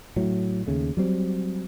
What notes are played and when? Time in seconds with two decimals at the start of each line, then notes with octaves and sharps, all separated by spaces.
0.16 A2 F#3
0.67 D#2 C#3 A3
0.97 F#3 G3 C4